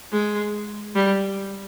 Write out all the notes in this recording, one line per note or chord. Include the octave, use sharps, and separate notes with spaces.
G#3
G3